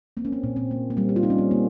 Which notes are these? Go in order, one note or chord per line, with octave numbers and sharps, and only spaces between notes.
A#3 C4
C#4
C4
A#2
C4
A#3
A#3
G3 C4
G4
F4
G3 D#4
C#4
C4
A#3